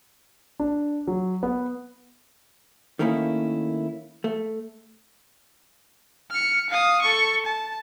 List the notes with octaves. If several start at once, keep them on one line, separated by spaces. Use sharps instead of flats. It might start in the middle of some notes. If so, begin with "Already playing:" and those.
D4
F#3
B3
D#3 A3 A#3 C#4 E4
A3
F6 C#7
F5 D#6
A4 C#6
A5